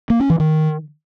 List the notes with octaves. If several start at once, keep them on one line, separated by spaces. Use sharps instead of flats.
A#3
C#4
E3
D#3